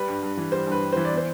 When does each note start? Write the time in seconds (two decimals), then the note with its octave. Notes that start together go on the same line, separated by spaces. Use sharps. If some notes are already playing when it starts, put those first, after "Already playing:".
Already playing: G3 B4
0.08 G2
0.23 G2
0.37 E3
0.52 G3 C5
0.67 G2
0.72 B4
0.82 G2
0.93 E3 C5
1.05 D5
1.12 B3
1.17 C5